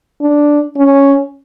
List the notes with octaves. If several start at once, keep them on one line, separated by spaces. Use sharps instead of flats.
D4
C#4